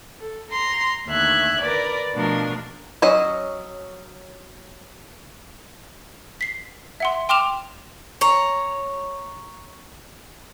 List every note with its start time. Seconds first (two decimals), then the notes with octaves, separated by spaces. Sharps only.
0.19 A4
0.50 A#5 C6 A#6
1.07 D#2 D3 A3 E5 F#6 G#6
1.60 A#4 B4 D5
2.14 B2 F3 A3 D4 F4 A#4
3.02 F#3 C#4 D#5
6.41 B6 C7
7.00 E5 F#5 C6
7.29 G5 C6 D6 F6 E7 F7
8.21 C#5 A#5